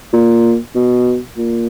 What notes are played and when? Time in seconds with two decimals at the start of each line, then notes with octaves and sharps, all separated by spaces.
0.13 A#2
0.75 B2
1.37 A#2